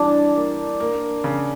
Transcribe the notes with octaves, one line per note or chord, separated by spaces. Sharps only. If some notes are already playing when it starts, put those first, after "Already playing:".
Already playing: E3 G3 D4
A#3
A#3
C#3